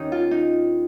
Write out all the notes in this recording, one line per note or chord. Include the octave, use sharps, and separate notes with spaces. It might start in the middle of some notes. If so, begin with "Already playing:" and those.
Already playing: D#2 D#3 C#4 D#4
F4
D#4